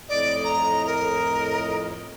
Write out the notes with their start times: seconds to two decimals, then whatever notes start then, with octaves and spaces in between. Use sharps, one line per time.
0.09 F2 A2 D5 D#5
0.44 A#5
0.86 A#4